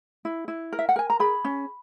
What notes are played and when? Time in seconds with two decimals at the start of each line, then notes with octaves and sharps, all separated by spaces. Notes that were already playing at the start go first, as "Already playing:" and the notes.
0.25 E4
0.48 E4
0.73 A#4
0.79 E5
0.89 F#5
0.96 A#4 G#5
1.10 A#5
1.20 G#4 B5
1.45 C#4